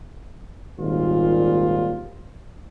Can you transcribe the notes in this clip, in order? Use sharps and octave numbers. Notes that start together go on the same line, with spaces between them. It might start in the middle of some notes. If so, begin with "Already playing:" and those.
G#1 D#2 A#2 G3 F4